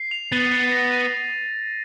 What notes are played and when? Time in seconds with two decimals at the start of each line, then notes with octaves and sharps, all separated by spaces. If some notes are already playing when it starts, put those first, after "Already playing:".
Already playing: C7
0.11 F7
0.32 B3 A6
0.51 A6
0.72 A#6
0.92 D#7